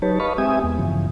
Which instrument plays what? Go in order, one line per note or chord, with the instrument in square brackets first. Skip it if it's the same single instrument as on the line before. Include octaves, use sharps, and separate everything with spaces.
[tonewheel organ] F#3 D#4 G4 B4 C#5 A5
B4 D#5 F5 A5 B5 C#6
G#3 C4 G4 E5 G#5 D#6
E2 G#3 B3
G2 C#3 E3 F3